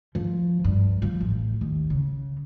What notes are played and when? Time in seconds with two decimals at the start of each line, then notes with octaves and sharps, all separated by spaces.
0.15 F3
0.64 G2
1.02 F3
1.20 A1
1.61 D#2
1.90 C#3